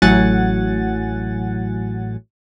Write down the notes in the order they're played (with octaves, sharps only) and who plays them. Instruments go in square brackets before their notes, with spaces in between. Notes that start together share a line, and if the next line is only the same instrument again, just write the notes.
[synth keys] A1 A2 F#3 F#5 G#5 A6